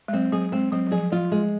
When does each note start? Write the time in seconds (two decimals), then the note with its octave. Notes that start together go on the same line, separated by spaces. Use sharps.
0.08 G#3
0.13 F#3 C4
0.32 F#3 G#4
0.52 G#3 C4
0.72 F#3 C4
0.87 F#3
0.92 F3 G#4
1.12 F3 F4
1.32 G#3